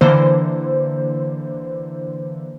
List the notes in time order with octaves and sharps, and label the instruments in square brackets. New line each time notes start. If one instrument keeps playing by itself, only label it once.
[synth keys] D3 E3 A#3 C5